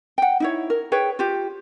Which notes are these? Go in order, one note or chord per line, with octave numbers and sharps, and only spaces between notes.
F#5 G5
D#4 E4 C#5
A#4
G#4 B4 C#5 G5
F4 G4